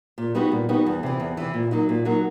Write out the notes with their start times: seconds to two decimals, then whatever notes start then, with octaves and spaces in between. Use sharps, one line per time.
0.18 A#2
0.35 G3 B3 D#4 F#4
0.52 A#2
0.69 G3 B3 D#4 F#4
0.86 E2
1.03 C3 E3
1.20 E2
1.37 C3 E3
1.54 A#2
1.71 F#3 A#3 D#4 F#4
1.89 A#2
2.05 F#3 A#3 D#4 F#4